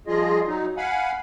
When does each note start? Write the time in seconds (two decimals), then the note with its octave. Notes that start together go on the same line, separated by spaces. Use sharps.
0.07 F3 G3 F4 G#4 D#5
0.46 F#3 D#4
0.77 F5 F#5 G#5 B5